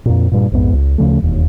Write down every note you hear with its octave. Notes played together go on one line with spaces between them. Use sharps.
F2 A#2
G2 A#2
A#1 F2 G#2 B3
C#2
D2 C#3 F3 A3
E1 D#2